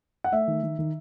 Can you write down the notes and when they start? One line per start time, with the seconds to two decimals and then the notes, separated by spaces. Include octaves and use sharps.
0.24 F#5
0.32 A3 E5
0.48 D#3
0.63 D#3
0.79 D#3